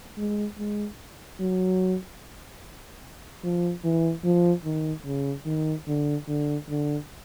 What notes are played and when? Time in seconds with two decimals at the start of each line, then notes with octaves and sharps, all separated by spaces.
0.18 G#3
0.58 G#3
1.40 F#3
3.43 F3
3.84 E3
4.24 F3
4.64 D#3
5.05 C#3
5.46 D#3
5.88 D3
6.28 D3
6.69 D3